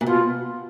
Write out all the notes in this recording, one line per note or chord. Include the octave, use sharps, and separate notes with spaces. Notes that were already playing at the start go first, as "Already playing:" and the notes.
A#2
B2 F4